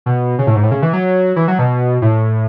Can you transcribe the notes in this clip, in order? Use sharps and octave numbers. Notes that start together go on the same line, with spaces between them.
B2
C#3
A2
G#2
A2
C#3
E3
F#3
E3
F#3
B2
A2